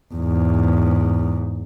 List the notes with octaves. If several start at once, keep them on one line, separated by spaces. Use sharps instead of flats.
E2 G#2